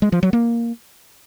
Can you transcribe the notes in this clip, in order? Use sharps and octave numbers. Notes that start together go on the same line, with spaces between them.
G#3
F3
F#3
A#3